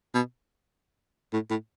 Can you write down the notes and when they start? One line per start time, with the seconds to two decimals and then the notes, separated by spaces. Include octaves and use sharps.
0.15 B2
1.33 A2
1.51 A2